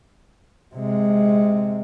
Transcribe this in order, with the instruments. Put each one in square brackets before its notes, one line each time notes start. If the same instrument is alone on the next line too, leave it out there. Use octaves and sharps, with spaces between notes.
[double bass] C3 G#3